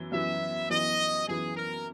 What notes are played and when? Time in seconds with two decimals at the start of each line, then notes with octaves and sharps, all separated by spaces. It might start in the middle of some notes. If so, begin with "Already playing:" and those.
Already playing: F#2 E3 B3
0.12 F#2 E3 B3 E5
0.70 F#2 E3 B3 D#5
1.28 F#2 E3 B3 G#4
1.57 A#4